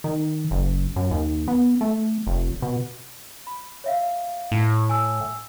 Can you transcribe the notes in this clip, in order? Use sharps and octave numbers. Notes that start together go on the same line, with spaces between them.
D#3
F#1
F#2
D#2
B3
A3
F1
B2
B5
C#5 E5 F5
A2
G#5 E6